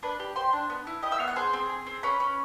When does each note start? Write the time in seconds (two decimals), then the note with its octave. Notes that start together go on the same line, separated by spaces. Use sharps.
0.03 D4 B4 B5
0.20 G4
0.36 G4 C5 C6
0.53 D4
0.70 B3
0.87 E4
1.02 G4 D#5 D#6
1.11 E5 E6
1.19 B3 F5 F6
1.28 F#5 F#6
1.36 G#4 C5 C6
1.53 C4
1.70 G#4
1.86 C4
2.03 C#4 B4 B5
2.20 C#4